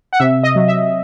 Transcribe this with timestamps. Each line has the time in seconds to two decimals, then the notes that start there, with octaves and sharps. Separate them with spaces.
0.13 F#5
0.20 C3 E5
0.43 D#5
0.56 F#3
0.68 E5